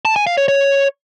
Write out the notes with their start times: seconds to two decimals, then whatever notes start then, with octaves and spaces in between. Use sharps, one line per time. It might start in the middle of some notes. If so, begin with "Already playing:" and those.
0.05 A5
0.16 G#5
0.27 F5
0.38 C#5
0.48 C#5